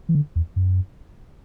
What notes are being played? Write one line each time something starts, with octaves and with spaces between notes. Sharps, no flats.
E3
D3
E2
F#2